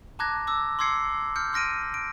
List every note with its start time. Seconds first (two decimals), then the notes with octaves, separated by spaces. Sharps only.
0.19 A5 A#5 D6 F#6 G#6 A#6
0.47 D6 E6
0.79 C6 D6 E6 G#6 C7 C#7
1.36 F6 G6 C#7
1.53 C6 F6 A#6 D7 D#7
1.94 D7